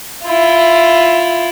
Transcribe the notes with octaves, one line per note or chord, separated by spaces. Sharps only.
E4 F4